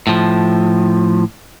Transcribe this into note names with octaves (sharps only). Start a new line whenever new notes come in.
A2 F3